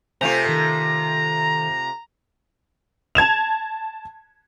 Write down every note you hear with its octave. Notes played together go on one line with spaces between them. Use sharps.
C3 A3 F4 C5 G#5 A#5 G6
D#3 A4
A5 G#6 E7 F7